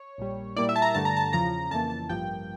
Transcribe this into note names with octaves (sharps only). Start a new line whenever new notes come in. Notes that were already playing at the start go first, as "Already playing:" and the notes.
Already playing: C#5
A#1 A#2 G3
A#2 G3 A#3 E4 D5
E5
A5
A#5
G2 D3 A3 A5
A#5
A5
E2 C#3 F3 A#5
F2 C#3 E3 A#3 A5
A5
A1 G2 F3 A#3 G5